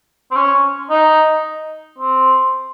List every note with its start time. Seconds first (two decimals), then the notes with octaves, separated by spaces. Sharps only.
0.31 C4
0.36 C#4
0.90 D#4
1.98 C4